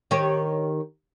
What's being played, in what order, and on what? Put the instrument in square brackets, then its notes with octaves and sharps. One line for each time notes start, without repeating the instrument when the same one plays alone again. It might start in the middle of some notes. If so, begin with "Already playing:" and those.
[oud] D#3 G4 C#5